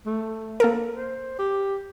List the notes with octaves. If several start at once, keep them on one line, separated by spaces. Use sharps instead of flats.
A3
A#3 A4 A#4
C5
G4